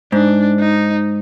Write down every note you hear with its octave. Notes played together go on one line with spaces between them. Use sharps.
G#2 D4
D#4